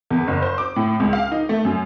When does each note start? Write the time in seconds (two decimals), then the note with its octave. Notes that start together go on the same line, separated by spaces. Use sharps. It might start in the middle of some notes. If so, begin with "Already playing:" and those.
0.10 E2
0.28 F#1
0.42 C5
0.58 D6
0.76 A2
1.00 C#2
1.13 F5
1.32 D#4
1.49 A3
1.65 F#2